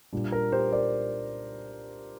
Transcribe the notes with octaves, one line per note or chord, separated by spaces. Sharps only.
A#2 G3 D4
A#4
G4 C5
A#4 D5